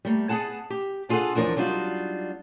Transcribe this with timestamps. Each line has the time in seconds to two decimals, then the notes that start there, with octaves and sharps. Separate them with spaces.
0.05 G3 A3 A#3
0.29 B3 G#4 F#5 A5
0.70 G4
1.09 D4 F4 G#4 A4 F5 F#5
1.35 E2 F3 D4 A#4 C#5
1.56 F#3 G3 D4 D#4 F4 F#4